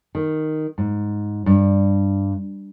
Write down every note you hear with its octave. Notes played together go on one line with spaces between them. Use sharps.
D#3
G#2
G2